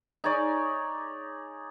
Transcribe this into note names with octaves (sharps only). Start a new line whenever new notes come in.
D#4 G#4 C#5 D5